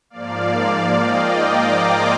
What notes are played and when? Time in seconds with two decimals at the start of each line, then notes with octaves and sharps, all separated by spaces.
0.10 G#2 F3 A#3 D5 F5
0.97 D#5 G5
1.41 A#5 D6
1.85 G#5 C6